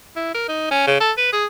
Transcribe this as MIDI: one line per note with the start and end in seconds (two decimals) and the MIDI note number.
0.16 0.34 64
0.34 0.44 70
0.48 0.69 63
0.71 0.82 61
0.87 0.96 49
1.00 1.12 69
1.17 1.30 71
1.32 1.45 68